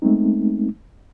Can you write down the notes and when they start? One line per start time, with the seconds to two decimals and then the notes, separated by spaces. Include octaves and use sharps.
0.02 G#3 A3 B3 C4 D#4